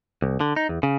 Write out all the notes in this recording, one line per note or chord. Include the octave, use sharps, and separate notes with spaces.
C2
D3
D#4
E2
C#3